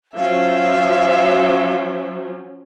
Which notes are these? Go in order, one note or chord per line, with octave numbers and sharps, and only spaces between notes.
F3 F#3 C#4 E5 F5